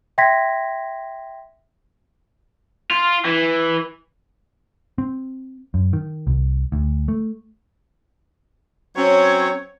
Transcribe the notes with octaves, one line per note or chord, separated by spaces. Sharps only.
E5 G5 C6 G#6 A#6 B6
F4
E3
C4
F#2
D#3
C2
D2
A3
F#3 C4 C#4 C#5